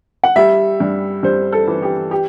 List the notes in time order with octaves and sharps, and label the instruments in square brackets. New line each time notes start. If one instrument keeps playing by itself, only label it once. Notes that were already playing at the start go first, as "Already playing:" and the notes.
[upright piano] F#5
G3 E5
G2
G2 C5
A4
E3
G4
G4